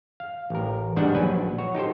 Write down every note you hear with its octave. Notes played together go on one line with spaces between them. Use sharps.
F5
A1 A#4
G#2 D#3 G3 D4 F#5 A5
A#1 F#3 B4 G#5
F#4 C#5
D#4 G4 A4 C5